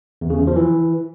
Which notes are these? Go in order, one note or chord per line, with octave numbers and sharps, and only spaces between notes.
E2
C#3
E2
F3
E3